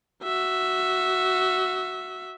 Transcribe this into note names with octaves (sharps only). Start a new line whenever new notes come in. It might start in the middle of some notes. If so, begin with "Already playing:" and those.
F#4 E5